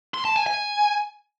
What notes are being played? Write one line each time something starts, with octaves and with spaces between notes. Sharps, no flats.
C6
A5
G#5
G#5